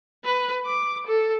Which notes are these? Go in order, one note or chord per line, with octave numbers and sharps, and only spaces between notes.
B4
D6
A4